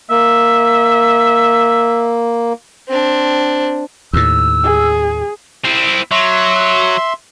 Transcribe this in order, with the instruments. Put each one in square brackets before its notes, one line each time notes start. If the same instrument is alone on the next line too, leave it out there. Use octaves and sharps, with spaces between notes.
[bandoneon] A#3 [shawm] E5
[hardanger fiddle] C4 D4
[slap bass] D#2 A2 [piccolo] E6
[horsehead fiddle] G#4
[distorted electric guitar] C4 E4
[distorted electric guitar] F#3 [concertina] E5 C6